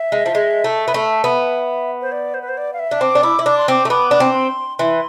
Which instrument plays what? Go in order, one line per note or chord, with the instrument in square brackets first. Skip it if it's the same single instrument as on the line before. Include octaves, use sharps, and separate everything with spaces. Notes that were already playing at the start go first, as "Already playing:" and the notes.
Already playing: [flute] E5
[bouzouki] G#3
F3
G#3
A3
B3
A3
B3
[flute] C5
D5
C5
B4
C5
D5
F5
E5
[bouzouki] D4
[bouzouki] C4 [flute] D6
[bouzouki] D4
E4
E4
[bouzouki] D4 [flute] D6
[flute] C6
[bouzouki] C4 [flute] D6
[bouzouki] A3
[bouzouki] B3 [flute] D6
[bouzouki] D4
C4
[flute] C6
[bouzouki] E3 [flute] C6